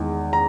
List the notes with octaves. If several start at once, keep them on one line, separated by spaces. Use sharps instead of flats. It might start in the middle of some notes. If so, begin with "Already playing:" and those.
Already playing: E2 D#3 G#3
A#5